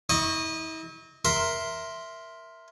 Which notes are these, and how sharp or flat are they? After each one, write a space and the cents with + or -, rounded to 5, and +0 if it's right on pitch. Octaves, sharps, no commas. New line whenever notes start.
E4 -45 D#5 -15 C#6 +0
A#4 +10 E5 +0 C6 +0